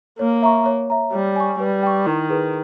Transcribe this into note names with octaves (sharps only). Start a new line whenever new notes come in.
A#3 C#5
E5 A#5 C#6
C#5
E5 A#5
G3 C#5
G#5 C#6
G3 B4
G5 C#6
D#3 E4
G#4 B4